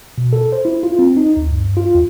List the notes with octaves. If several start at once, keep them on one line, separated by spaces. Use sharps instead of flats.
B2
A4
C5
E4
F4
C4
D#4
D2
G2
F4
E2